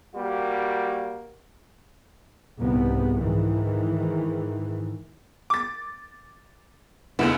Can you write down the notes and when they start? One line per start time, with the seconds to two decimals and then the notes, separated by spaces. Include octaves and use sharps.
0.16 G3 A#3 F#4
2.59 C2 G#2 C3 B3
3.20 G#2 D#3 E3
5.50 D6 A6
7.19 F1 C#2 D3 B3 E4